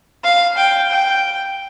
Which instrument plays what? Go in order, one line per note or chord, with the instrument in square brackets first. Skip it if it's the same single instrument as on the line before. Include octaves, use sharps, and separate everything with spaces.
[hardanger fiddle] F5
G5
G5